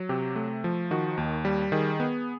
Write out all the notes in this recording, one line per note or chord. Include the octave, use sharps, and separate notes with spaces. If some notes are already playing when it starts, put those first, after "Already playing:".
Already playing: F#3
C3 G4
A3
F3
D#3 F#4
D#2
G3
D#3 G#4
B3